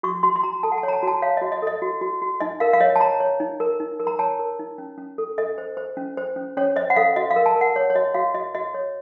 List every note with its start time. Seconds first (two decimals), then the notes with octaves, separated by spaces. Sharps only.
0.03 F#4 C#6
0.23 F#4 C6
0.36 C6
0.43 F#4 A#5
0.63 A4 A5
0.72 F#5
0.78 A5
0.83 C#5
0.88 A#5
0.93 A5
1.03 F#4 A5
1.22 C#5 F5
1.37 F#4 D#5
1.52 D#5
1.62 A4 D#5
1.82 F#4
2.01 F#4
2.22 F#4
2.40 D#4 D#5
2.60 A#4 F5
2.73 F5
2.81 C#5 D#5
2.96 A5
3.00 C#5 A#5
3.20 C#5
3.40 D#4
3.60 A#4
3.80 D#4
4.00 A#4
4.07 A#5
4.19 C#5 A5
4.39 A#4
4.59 D#4
4.78 C#4
4.98 C#4
5.18 A4
5.38 A4 D#5
5.58 C5
5.77 C5
5.97 C#4
6.17 C5
6.36 C#4
6.57 C#4 C#5
6.76 C5 D#5
6.90 F#5
6.96 A4 F5
7.16 F#4 D#5
7.31 F5
7.36 A#4
7.46 A5
7.56 A#4
7.61 F#5
7.76 C#5
7.90 C#5
7.95 F#4 D#5
8.14 F#4 F5
8.34 F#4 D#5
8.55 F#4 D#5
8.74 C#5